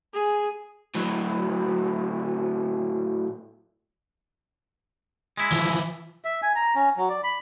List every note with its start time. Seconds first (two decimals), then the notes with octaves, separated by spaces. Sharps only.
0.13 G#4
0.95 A2 F#3
5.37 G#3 E4
5.52 E3 F3
6.25 E5
6.43 G#5
6.56 A#5
6.75 C#4
6.97 F#3
7.09 D5
7.24 B5